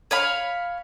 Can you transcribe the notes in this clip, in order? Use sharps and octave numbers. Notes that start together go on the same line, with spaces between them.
C#5 F5 B5